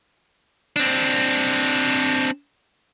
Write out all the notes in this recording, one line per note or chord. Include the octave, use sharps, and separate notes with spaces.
C4 D4